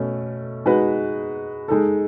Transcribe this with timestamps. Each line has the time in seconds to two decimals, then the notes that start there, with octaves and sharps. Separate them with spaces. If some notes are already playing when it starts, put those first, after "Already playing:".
Already playing: B2 A3 C#4
0.66 G#3 D#4 F#4 B4
1.68 G#3 D#4 A4